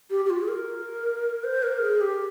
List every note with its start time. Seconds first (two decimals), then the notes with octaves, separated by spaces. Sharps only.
0.10 G4
0.25 G4
0.30 F4
0.41 G#4
0.48 A#4
1.44 C5
1.63 A#4
1.81 G#4
2.01 G4